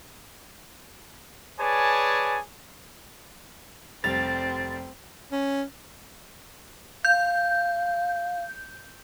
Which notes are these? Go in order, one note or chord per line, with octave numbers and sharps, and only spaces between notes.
G#4 B4 C#5 D5 G#5 A5
F1 G3 C4 A6 F7
C#4
F5 G6